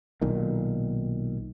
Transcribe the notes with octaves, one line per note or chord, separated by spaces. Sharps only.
B1 A#2 D#3